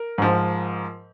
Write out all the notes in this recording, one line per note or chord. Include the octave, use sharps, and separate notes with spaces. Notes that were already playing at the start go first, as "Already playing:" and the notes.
Already playing: A#4
G#2 F3